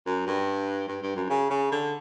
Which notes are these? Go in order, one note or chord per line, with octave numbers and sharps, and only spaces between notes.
F#2
G2
G2
G2
F#2
C#3
C#3
D3